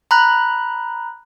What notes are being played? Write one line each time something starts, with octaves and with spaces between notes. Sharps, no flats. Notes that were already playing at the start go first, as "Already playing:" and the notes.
A#5 B5 F#6